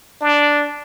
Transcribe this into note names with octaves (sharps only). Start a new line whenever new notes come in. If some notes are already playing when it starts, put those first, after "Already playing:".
D4